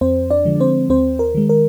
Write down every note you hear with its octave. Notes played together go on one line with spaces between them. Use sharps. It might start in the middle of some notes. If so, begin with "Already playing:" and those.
F2 C4 C5
D4 D5
D3 F3 G#3
C4 C5
D#2 C4 C5
A#4
D#3 G#3
A#4